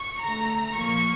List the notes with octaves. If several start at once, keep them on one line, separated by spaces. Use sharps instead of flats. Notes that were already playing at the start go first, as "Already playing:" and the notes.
Already playing: C#6
D3 A3 A#5
A#2 F3 A#3 C#6